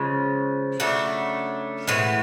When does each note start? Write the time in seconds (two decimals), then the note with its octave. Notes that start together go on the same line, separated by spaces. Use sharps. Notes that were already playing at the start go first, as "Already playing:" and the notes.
Already playing: C#3 F3 G#3
0.80 C#3 F#3 A3 D4
1.88 A2 E3 G#3 B3